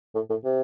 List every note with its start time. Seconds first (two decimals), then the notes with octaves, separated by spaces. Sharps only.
0.15 A2
0.30 A2
0.45 C3